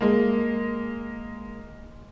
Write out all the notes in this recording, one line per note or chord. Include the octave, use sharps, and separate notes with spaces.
G#3 A#3